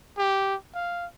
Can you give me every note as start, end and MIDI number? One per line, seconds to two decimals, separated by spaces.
0.18 0.55 67
0.75 1.06 77